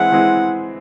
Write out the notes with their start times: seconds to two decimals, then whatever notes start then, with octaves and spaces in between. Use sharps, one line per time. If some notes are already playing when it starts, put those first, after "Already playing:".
Already playing: E3 G#3 C4 E4 G#4 F#5
0.12 E3 G#3 C4 E4 G#4